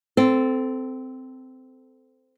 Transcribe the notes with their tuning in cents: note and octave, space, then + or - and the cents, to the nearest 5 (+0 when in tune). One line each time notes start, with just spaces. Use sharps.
C4 -15 A4 +0